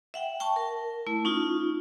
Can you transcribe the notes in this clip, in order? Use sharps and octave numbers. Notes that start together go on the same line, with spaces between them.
E5 F#5 G5
G5 A5 C#6
A#4
A3 E4
C#4 D#4 F4